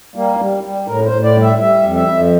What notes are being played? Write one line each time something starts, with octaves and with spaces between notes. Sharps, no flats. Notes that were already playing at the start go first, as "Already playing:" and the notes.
G3 A#3
G3
G3
A2 A#4
C5
A2
D5
G3
E5
G3 E5
F2
E5
F2